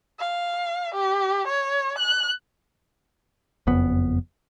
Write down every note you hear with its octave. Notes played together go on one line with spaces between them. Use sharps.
F5
G4
C#5
F#6
F#1 F2 B3